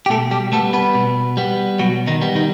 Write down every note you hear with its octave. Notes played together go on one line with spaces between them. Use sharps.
G4
B2 A3 A4
G3 G4
G3 A3 B3 A4
B3 B4
B2
G3 B3
B2 F#3 F#4
D#3 D#4
G3 B3
D#3 D#4